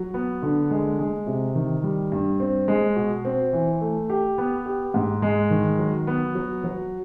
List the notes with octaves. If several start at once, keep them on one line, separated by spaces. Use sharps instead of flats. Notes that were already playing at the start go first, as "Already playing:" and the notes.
Already playing: F#3
B3
D3
G#3
G#3
C3
D#3
G3
G2
C4
G#3
B2
C4
E3
A3
G4
B3
G4
G#2
G#3
D#3
F#3
B3
F#3
F#3